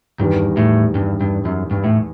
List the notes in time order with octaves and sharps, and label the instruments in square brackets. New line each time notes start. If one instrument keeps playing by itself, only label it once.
[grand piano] E2 D#3 G3 [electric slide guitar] G2
[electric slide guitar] A2
G2
G2
F#2
G2
A2